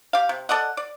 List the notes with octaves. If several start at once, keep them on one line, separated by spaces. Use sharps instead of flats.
G4 F5
C3
A4 D5 D#5 F#5
D5